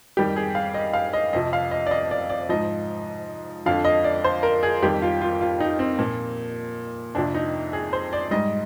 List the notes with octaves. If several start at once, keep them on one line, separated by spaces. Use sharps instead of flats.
F2 D#3 G3 G4
G#4
F5
D#5
F5
D#5
F2 C3 F3 D#5
F5
D#5
D5
D#5
D5
D5
G#2 F3 D#5
F2 D3 F3 F5
D#5
D5
C5
A#4
G#4
F2 D#3 G3 G4
F4
F4
F4
D#4
C4
A#2 F3 A#3
F2 C3 F3 D4
D#4
G#4
C5
D5
G#2 G3 D#5